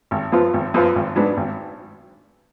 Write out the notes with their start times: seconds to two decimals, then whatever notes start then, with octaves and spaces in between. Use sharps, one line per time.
0.11 G#1
0.32 F#2 F3 B3 F4
0.54 G#1
0.74 F#2 F3 B3 F4
0.96 G#1
1.16 G#2 F#3 B3 D4
1.37 G#1